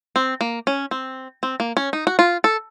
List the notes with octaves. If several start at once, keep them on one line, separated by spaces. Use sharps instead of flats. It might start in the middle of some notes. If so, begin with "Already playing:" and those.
C4
A#3
C#4
C4
C4
A#3
C#4
D#4
F#4
F4
A4